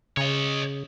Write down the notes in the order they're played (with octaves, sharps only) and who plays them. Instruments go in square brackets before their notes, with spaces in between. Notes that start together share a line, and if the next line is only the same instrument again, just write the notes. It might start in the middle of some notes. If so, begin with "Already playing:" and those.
[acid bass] C#3 [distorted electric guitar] C#5 D#5